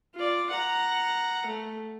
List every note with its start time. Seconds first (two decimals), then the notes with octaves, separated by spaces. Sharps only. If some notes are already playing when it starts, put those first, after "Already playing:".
0.15 F4 D5
0.50 F#5 A#5
1.46 A3